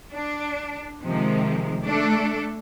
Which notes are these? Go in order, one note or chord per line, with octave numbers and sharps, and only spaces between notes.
D4
C3 D#3 F3 G#3
A3 D4 A4